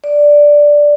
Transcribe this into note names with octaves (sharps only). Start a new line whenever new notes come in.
D5